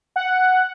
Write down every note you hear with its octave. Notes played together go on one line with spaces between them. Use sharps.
F#5